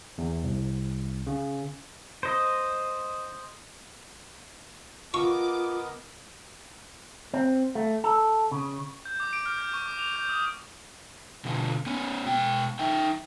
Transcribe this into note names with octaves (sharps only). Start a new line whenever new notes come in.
E2
C2
C#3
C5 D#5
B3 F4 A#4 D#5 C#6 D6
C4
A3
A4
C#3
G6
D6
D7
F6
G6
C#6
D6
F7
G6
D#6
B2 D3 F3
B3 C#4
B2 G#3 G5
D#4 E5 G5